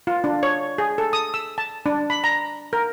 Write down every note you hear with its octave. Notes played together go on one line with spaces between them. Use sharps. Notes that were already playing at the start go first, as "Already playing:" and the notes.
F4
D4
C#5
G#4
A4
D#6
E6
A5
D4
B5
A#5
A#4